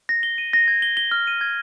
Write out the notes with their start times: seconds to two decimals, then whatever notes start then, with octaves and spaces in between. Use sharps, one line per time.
0.09 A#6
0.23 G7
0.38 D#7
0.53 A#6
0.68 G#6
0.82 G7
0.97 G7
1.11 F6
1.27 D#7
1.41 G#6